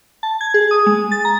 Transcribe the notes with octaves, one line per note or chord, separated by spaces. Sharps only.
A5
G#6
G#4
D#6
G#3
A6
A#5